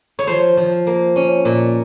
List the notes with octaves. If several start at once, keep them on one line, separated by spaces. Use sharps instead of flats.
C#5
F3 C5
F3
A#3
C#4
A#2